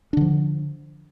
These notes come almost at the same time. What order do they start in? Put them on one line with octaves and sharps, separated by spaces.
D4 D3 F3